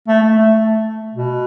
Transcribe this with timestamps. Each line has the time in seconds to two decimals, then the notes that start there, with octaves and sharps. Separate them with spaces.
0.08 A3
0.22 A3
0.38 A3
1.15 B2